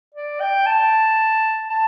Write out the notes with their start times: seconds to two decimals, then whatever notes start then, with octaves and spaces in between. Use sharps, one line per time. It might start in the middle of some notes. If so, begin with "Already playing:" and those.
0.14 D5
0.40 G5
0.66 A5
1.70 A5